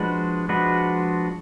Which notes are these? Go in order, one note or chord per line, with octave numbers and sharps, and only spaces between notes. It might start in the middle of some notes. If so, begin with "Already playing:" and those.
Already playing: F3 G#3 D4 F#4 B4
F3 G#3 D4 F#4 B4